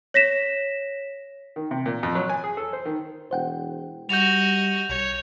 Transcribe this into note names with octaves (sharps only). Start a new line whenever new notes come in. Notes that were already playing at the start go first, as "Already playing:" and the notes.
C#5 A#6 B6 E7
D#3
C3
A#2
F2
F#3
G#5
G#4
A4
C5
D#3
E1 C5 F#5 G5
G3 F#4 D#5 G6 F7
B1 C#5